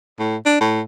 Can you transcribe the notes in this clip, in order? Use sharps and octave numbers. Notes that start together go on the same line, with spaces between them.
A2
D4
A2